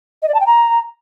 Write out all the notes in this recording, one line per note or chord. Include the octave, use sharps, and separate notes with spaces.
D#5
D5
A5
G5
A#5